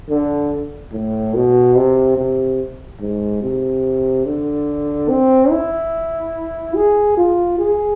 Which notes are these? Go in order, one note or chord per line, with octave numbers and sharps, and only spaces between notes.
D3
A2
B2
C3
C3
G#2
C3
D3
C4
E4
G#4
F4
G#4